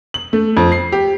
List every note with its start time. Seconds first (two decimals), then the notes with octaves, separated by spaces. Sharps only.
0.14 F#7
0.33 A3
0.57 F2
0.72 C7
0.92 G4